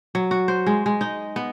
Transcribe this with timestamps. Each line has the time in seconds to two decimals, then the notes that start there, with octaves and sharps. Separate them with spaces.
0.15 F#3
0.31 F#4
0.48 C5
0.67 G#3
0.86 G#3
1.01 D#4
1.36 B3